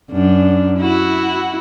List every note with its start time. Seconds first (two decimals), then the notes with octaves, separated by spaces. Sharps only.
0.11 F#2 D4
0.79 E4 F#4